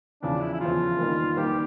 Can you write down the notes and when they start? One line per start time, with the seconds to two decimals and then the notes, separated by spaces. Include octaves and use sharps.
0.22 E2 C#3 F3 D4
0.41 E4
0.53 E4
0.60 E2 C#3 F3 F4
0.99 D#3 G3 A#3
1.37 D#3 G3 A#3 G4